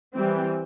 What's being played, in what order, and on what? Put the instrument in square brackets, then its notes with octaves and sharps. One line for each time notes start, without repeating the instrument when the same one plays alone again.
[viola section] E3 G3 C4